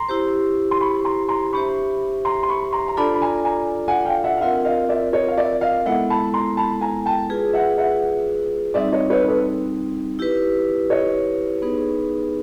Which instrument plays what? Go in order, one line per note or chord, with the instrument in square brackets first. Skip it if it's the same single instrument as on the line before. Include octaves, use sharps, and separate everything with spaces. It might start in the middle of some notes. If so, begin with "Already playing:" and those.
Already playing: [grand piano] A#5 C6
[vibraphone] E4 G4 C5
[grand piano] C6
B5 C#6
A#5 C6
A#5 C6
[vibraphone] D4 G4 C5 E5 [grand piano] B5 C#6
[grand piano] A#5 C6
C6
B5 C#6
A#5 C6
A#5
[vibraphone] D4 F4 A4 D5 [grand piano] A5 B5
[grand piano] B5
G#5 A#5
G#5 A#5
F#5 G#5
F5 G5
E5 F#5
F5
[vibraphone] C4 F4 A#4 [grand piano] E5 F#5
[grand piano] D#5 F5
D5 E5
C#5 D#5
F5
D5 E5
D#5 F5
[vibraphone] G#3 B3 E4 A4 [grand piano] E5 F#5
[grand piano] A5 B5
A#5 C6
A5 B5
G#5 A#5
G5 A5
[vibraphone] F4 G#4 B4
[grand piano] E5 F#5
E5 F#5
[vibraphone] G3 C4 D#4 [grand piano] D5 E5
[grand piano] C#5 D#5
B4 C#5
A4 B4
[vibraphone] E4 G4 B4
[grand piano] C#5 D#5
[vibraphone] B3 D#4 G#4 B4